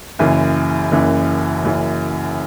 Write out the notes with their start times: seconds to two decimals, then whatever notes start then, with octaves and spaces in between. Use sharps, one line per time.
0.19 F#1 F#2 C#3 E3
0.91 F#1 F#2 C#3 E3
1.63 F#1 F#2 C#3 E3